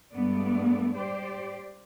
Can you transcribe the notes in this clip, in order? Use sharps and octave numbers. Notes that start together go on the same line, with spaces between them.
G2 G#3 A3 B3 D5
G4 C5 D5